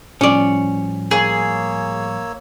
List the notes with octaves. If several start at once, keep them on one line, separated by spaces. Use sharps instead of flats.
A2 F3 G3 C#4 D5
A#3 G#4 C#5 E6